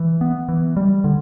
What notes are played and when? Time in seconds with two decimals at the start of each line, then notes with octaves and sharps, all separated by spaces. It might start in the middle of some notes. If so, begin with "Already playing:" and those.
Already playing: E3
0.21 B3
0.49 E3
0.77 G3
1.04 D3